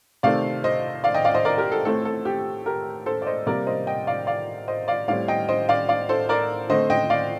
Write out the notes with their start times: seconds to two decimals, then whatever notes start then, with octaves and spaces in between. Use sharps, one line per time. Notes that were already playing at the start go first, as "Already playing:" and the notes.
0.23 C3 D#3 A3 C4 D5 F5
0.64 C5 D#5
1.04 D5 F5
1.14 D#5 G5
1.25 D5 F5
1.35 C5 D#5
1.45 A#4 D5
1.58 G4 A#4
1.72 A4
1.85 A2 A3 C4 A4
2.05 A4
2.25 G4
2.66 G4 A#4
3.06 A4 C5
3.22 D5
3.27 C5 D#5
3.47 C3 G3 A#3 A#4 D5
3.67 C5 D#5
3.87 D#5 G5
4.07 D5 F5
4.27 D5 F5
4.68 C5 D#5
4.88 D5 F5
5.08 A2 G3 C4 D5 F5
5.28 D#5 G5
5.49 C5 D#5
5.69 D5 F5
5.89 D5 F5
6.09 A4 C5
6.29 A#4 D5
6.69 D3 A3 C4 C5 D#5
6.90 D#5 G5
7.10 D5 F5